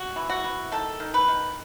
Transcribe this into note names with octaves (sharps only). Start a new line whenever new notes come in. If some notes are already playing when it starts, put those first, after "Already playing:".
Already playing: F#4
E3
F#4
E3
D#3 A4
D#3
B4
D#3